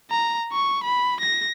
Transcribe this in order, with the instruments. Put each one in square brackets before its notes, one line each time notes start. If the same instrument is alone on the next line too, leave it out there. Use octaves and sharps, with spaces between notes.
[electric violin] A#5
C#6
B5
A#6